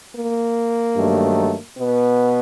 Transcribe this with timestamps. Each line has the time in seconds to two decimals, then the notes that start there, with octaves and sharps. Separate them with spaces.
0.16 A#3
0.97 G2 D#3 F#3 A3
1.77 B2 B3